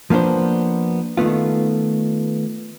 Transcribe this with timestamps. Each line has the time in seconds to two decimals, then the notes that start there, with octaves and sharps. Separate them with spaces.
0.10 F3 A#3 B3 D4 C5
1.17 D#3 A3 B3 F4